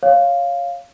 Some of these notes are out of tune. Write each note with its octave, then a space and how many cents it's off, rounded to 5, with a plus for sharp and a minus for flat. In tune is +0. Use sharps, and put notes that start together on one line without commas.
C#5 +0 F5 +0